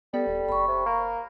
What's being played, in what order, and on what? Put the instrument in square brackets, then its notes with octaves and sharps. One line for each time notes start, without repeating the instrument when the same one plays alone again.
[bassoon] G3 [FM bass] B3 [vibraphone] A4
[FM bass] D#1
[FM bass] F#1 [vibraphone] B5 C#6
[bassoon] C3
A#3